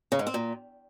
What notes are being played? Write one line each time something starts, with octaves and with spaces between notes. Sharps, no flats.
C#3
G#2
C4
A#2